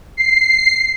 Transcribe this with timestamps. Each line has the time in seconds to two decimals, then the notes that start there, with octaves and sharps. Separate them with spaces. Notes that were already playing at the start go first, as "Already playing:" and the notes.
0.17 C7